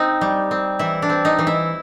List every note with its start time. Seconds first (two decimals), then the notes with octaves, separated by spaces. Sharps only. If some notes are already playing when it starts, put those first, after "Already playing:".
Already playing: C4 D#4
0.21 G3
0.51 C4
0.79 E3 E4
1.02 D4
1.09 C4
1.25 D#4
1.39 E3
1.47 E4